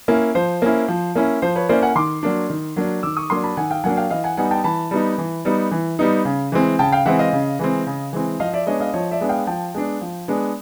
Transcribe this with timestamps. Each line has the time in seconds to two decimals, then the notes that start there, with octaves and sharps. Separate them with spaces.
0.08 A#3 C#4 E4
0.35 F3 C5
0.62 A#3 C#4 E4
0.88 F3
1.16 A#3 C#4 E4
1.42 F3 C5
1.56 B4 C#5
1.69 A#3 C#4 E4 C5 D5
1.82 F#5 G#5
1.96 D#3 C6 D6
2.23 F#3 A#3 D4
2.50 D#3
2.76 F#3 A#3 D4
3.03 D#3 D6 E6
3.17 C#6 D#6
3.30 F#3 A#3 D4 C6 D6
3.44 A5 B5
3.57 D#3 F#5 G#5
3.71 F5 G5
3.84 F#3 A#3 D4 F#5 G#5
3.97 F5 G5
4.10 E3 D#5 F5
4.24 F#5 G#5
4.37 G3 B3 D#4 F#5 G#5
4.51 G5 A5
4.64 E3 A5 B5
4.91 G3 B3 D#4
5.18 E3
5.45 G3 B3 D#4
5.71 E3
5.99 G3 B3 D#4
6.25 C#3
6.52 E3 G#3 C4
6.79 C#3 G5 A5
6.92 F5 G5
7.06 E3 G#3 C4 E5 F#5
7.19 D#5 F5
7.33 C#3
7.59 E3 G#3 C4
7.87 C#3
8.13 E3 G#3 C4
8.40 F3 D#5 F5
8.53 D5 E5
8.66 G#3 B3 D4 C#5 D#5
8.80 D#5 F5
8.93 F3 C#5 D#5
9.11 D5 E5
9.21 G#3 B3 D4
9.29 F5 G5
9.47 F3 G5 A5
9.74 G#3 B3 D4
10.01 F3
10.28 G#3 B3 D4